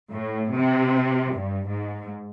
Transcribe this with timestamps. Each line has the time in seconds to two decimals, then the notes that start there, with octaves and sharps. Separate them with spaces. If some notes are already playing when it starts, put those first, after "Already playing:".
0.12 A2
0.55 C3
1.34 G2
1.68 G#2